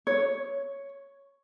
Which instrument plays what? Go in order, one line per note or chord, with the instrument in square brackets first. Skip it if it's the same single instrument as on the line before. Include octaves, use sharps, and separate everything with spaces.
[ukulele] C#5